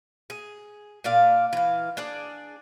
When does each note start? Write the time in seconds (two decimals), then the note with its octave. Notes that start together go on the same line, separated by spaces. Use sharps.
0.30 G#4
1.04 A#2 D4 D5 F5
1.53 E3 F5
1.97 D4 G#4 D5